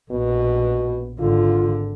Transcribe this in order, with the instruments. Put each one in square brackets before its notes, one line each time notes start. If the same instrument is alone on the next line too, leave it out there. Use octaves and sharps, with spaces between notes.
[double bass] A#1 [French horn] B2
[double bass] G#1 D3 [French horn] F4